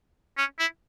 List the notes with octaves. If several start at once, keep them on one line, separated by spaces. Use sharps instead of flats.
C#4
E4